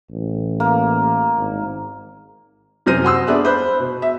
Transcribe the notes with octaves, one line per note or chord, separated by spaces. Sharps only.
A1
A#3
G#1
F#2 C3 C5 F6 A#6 D#7
F#5 C6 E6
B3 D4 G#4 E5 F#6
C5 B5 F#6
B2
E5